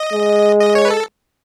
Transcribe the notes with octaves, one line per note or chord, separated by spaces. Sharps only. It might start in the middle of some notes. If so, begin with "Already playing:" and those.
Already playing: D#5
G#3
D#5
C#5
B4
A4